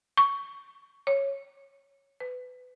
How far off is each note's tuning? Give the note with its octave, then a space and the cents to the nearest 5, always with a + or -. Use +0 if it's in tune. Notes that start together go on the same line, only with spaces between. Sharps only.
C#6 +15
C#5 -10
B4 +25